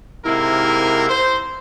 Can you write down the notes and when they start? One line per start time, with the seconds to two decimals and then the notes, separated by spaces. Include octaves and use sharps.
0.24 G#2 C3 A#3 E4 A#4
1.09 C5